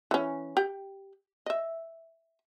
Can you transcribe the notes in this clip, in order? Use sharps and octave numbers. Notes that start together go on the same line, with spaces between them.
E3 C#4
G4 G5
D#5 E5